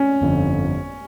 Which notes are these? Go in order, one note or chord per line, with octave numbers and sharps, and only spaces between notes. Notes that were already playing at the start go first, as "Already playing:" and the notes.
Already playing: C#4
G1 F2 D3